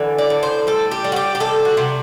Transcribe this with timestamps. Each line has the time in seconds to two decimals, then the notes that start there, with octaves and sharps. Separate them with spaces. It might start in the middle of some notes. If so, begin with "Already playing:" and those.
Already playing: D3 E3
0.18 D5
0.30 A2
0.43 C5
0.67 G3 A4
0.91 G4
1.04 G3
1.12 F#4
1.16 G4
1.35 G4
1.40 C3 A4
1.65 F#4
1.77 C3